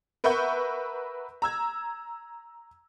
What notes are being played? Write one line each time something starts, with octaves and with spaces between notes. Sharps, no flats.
A#4 B4 E5 F#5 C#6 G6
A#5 E6 G#6